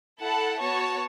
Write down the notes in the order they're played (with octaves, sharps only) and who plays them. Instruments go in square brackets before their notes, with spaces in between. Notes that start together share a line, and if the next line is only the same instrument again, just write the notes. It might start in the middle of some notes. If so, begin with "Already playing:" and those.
[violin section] E4 A4 F#5 A5
B3 F#4 C#5 A5